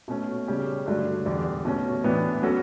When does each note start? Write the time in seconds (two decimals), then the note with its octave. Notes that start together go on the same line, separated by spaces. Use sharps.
0.08 B2 A3 C#4
0.48 C#3 G3 C#4 G4
0.86 G2 D3 F#3 A3 D4
1.26 E2 D3 G3
1.65 B2 A3 C#4
2.04 A2 E3 B3 D4
2.42 F#3 C#4 F#4 A4